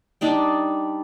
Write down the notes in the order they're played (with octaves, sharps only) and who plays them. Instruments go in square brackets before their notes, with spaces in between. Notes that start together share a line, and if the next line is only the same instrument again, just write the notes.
[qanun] G3 D4 D#4 G5